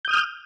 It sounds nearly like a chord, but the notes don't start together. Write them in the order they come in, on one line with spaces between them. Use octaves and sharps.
G6 D#6 F6